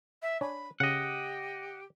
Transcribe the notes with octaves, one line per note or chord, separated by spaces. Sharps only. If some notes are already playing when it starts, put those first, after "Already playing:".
E5
D4 C#5 G#5 B5
C#3 G4 D#5 F#5